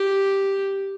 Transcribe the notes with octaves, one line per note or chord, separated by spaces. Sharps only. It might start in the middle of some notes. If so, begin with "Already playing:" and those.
Already playing: G4